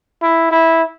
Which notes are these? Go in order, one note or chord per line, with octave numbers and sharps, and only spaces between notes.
E4
E4